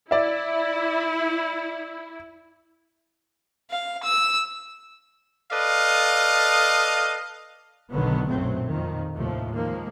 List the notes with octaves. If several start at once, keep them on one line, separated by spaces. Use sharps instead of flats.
E4 D5 E5
F5
E6
A4 B4 D5 D#5 F5
F#1 B1 D3 D#3 F#3 B3
B1 F#2 A#2 F#3 A3 C4
F2 A#2 D#3
D#2 A2 C3 F3 A3
D#3 F3 G#3 A#3